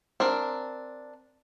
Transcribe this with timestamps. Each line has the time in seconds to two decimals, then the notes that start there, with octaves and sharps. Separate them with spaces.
0.20 C4 D4 A#4